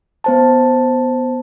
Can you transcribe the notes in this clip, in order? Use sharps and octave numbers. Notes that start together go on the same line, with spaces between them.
B3 C5 A5